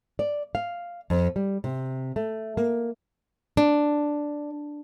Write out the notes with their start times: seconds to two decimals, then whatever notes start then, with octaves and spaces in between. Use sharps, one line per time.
0.19 D5
0.55 F5
1.10 F2
1.36 G3
1.64 C3
2.16 A3
2.57 A#3
3.57 D4